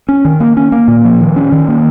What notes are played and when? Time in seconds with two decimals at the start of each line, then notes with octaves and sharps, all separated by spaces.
0.09 C#4
0.25 D#3
0.40 A#3
0.57 C#4
0.72 A#3
0.88 A#2
1.05 F3
1.21 D#3
1.36 C#4
1.52 D#3
1.68 A#3